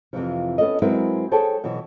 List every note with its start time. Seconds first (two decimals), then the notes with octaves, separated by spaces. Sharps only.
0.13 F2 C3 E3 F3
0.58 B3 C#4 A4 D#5
0.82 F#3 G#3 C4 E4 A#4 B4
1.31 G#4 A4 C5 C#5 G5 A5
1.64 B2 E3 F#3